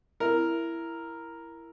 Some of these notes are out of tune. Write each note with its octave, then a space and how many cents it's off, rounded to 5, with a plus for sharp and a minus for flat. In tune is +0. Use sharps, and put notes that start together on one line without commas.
E4 +15 A#4 +0